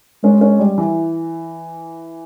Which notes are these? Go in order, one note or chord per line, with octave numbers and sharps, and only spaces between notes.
G#3 C#4
C#4
G3
E3